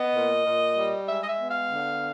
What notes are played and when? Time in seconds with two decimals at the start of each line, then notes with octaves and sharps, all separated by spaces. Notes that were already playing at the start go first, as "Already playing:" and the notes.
Already playing: B3 D#5
0.16 A#2
0.46 A#2
0.77 G3
1.08 G#3 E5
1.22 D#5
1.28 E5
1.38 B3
1.49 F5
1.69 D3